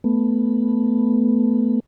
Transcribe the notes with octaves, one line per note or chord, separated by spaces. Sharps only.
A3 B3